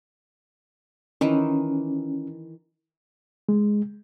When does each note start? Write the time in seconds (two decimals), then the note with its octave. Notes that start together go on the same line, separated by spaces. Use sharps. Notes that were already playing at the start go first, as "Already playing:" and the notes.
1.21 D#3 E3 C#4
3.49 G#3